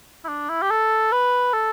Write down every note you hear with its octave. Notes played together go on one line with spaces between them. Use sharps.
E4
D4
E4
G4
A4
B4
A4